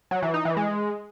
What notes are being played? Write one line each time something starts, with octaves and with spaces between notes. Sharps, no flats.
F#3
E3
D#4
E3
G#3